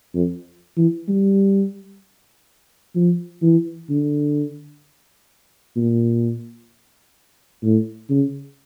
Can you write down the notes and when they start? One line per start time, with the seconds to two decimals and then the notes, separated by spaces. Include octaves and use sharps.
0.15 F2
0.77 E3
1.08 G3
2.96 F3
3.42 E3
3.90 D3
5.76 A#2
7.63 A2
8.10 C#3